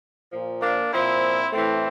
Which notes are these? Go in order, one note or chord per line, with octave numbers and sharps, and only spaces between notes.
A#2 F3
A#3 D4
A#2 F3 C4 E4
A2 E3 A3 C4